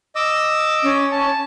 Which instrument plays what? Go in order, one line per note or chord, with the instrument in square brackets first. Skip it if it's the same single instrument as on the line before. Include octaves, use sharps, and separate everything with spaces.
[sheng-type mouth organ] D#5 D6 E6
[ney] C#4
[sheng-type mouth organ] A5